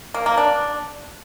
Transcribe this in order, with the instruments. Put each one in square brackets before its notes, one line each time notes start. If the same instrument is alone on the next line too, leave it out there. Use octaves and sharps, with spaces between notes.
[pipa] A#3
A#3
D4